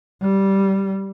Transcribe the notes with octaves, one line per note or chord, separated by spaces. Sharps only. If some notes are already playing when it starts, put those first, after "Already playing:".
G3